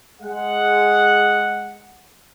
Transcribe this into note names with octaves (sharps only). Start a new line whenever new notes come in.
G#3 F#5